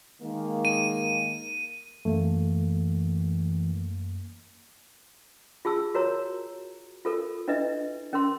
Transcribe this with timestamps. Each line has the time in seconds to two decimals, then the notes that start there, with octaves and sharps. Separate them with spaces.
0.22 D#3 G#3 A#3
0.65 D#7
2.05 F#2 E3 A3 A#3
5.65 F4 G#4 A5 E6
5.94 F#4 A#4 C#5 A#5
7.05 F4 A4 A#4
7.48 D4 E4 B4 D#5 E5
8.13 C#4 A#4 C6